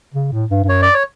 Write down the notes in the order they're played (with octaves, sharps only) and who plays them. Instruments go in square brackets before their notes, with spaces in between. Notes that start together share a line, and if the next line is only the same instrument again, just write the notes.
[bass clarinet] C#3
A2
G2
G2
[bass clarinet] F#2 [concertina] C#5
[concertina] D5
C#5